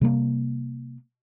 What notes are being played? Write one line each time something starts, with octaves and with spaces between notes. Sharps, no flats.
C3 G3 A#3